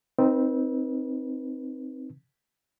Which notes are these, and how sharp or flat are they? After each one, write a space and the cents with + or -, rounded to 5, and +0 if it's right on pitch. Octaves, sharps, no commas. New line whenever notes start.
C4 +0 D#4 +0 B4 -35